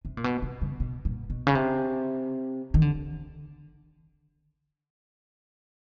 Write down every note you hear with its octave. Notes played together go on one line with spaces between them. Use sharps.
C3
A#2
B2
C3
C#3
B2
A#2
B2
C#3
C3
D#3
D3